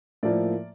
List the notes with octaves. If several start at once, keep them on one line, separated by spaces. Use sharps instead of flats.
A2 F3 A#3 A#4 D5